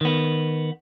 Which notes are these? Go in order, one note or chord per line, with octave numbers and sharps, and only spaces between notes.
D#3 B3